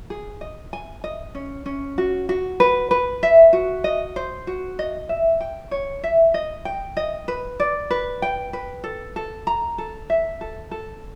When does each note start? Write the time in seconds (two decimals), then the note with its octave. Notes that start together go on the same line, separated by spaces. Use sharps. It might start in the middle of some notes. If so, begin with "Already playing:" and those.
0.10 G#4
0.41 D#5
0.73 G#5
1.04 D#5
1.35 C#4
1.66 C#4
1.98 F#4
2.29 F#4
2.60 B4
2.91 B4
3.23 E5
3.53 F#4
3.84 D#5
4.16 C5
4.47 F#4
4.79 D#5
5.09 E5
5.41 G5
5.71 C#5
6.03 E5
6.34 D#5
6.65 G5
6.97 D#5
7.28 B4
7.60 D5
7.90 B4
8.22 G5
8.53 B4
8.84 A4
9.16 A4
9.47 A#5
9.78 A4
10.10 E5
10.41 A4
10.71 A4